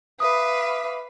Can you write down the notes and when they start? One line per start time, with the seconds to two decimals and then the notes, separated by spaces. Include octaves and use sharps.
0.20 B4 E5 F5 D6 D#6